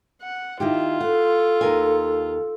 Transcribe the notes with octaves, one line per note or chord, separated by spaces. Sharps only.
F#5
D#3 E4 F4 G4
A4 F#5
D#2 A#4 G#5